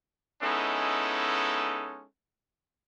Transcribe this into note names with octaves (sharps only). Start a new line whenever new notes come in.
G#3 B3 C#4 D#4 E4 A4